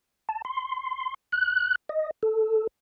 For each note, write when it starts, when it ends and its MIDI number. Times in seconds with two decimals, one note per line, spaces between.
0.29 0.42 81
0.45 1.14 84
1.32 1.75 90
1.89 2.11 75
2.23 2.67 69